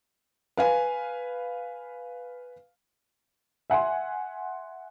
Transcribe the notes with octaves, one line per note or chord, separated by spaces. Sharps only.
B4 F5 G#5
E5 F#5 G#5 C6